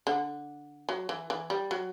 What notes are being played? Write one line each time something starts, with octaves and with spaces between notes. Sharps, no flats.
D3
F#3
E3
E3
G3
F#3